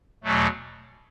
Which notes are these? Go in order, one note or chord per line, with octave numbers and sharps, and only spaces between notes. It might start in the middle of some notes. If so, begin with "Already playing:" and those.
E2 B2 F#3 A3